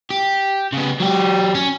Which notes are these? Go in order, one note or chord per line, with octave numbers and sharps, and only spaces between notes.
G4
C#3 B3
F#3 G4
C#4